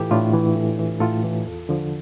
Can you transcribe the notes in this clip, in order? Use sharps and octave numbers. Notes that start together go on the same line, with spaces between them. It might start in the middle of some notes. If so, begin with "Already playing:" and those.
Already playing: A2 E3 E4 F4 G4 A4
A2 D4 F4
E3
A2
E3
A2 F4 A4
E3
E2
D3 F3